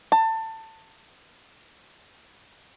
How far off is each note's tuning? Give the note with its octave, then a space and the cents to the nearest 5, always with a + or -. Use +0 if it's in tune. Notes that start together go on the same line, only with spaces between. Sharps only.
A5 +25